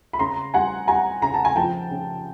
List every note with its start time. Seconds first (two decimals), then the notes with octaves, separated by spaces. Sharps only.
0.13 B5
0.19 C#3 A#5 C6
0.54 G3 F#5 G#5
0.88 G3 G#5 A#5
1.22 C#3 A#5
1.34 A5
1.45 G#5
1.56 F3 G5 A5
1.91 C#3